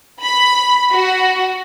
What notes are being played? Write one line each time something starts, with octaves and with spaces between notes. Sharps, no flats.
B5
F#4